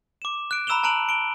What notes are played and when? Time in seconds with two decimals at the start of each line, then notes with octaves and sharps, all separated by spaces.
0.22 D6 E7
0.51 F#6 D7
0.67 A#5 B5 E6 E7 F7 G7
0.83 A5 A#5 F#6 D7 F7 F#7
1.09 D7 G7